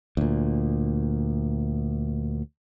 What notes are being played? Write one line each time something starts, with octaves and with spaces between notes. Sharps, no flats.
D2 A#2